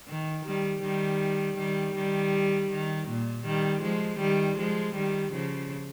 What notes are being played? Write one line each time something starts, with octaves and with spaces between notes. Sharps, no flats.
D#3
D#3 G3
D#3 G3
D#3 G3
D#3 G3
D#3
A#2
D#3 G3
F3 G#3
D#3 G3
F3 G#3
D#3 G3
C#3 F3